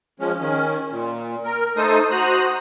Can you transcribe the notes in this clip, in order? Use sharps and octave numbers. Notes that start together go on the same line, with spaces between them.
F3 G#3 C#4
D#3 C#4
A#2
A#4
A3 D#4 A4 C5 D#6
F#4 C5 A#5 D#6 F#6